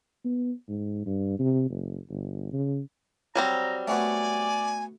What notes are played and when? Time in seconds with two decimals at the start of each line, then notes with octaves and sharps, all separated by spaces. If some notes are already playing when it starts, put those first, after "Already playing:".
0.25 B3
0.68 G#2
1.06 G2
1.39 C3
1.70 F#1
2.09 G1
2.53 C#3
3.35 F#3 G3 C4 A#5
3.88 A3 B3 F#4 D5 G#5